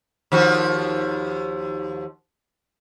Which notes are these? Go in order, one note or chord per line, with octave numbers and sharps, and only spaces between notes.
D#2 F3 F#4